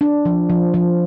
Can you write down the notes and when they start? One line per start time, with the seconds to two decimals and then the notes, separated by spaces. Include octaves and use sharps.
0.01 D4
0.25 F3
0.50 F3
0.74 F3